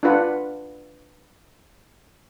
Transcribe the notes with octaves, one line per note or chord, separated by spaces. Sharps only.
D4 F4 B4 F#5